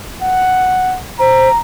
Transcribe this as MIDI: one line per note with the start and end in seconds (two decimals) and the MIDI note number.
0.22 0.99 78
1.20 1.49 72
1.20 1.60 82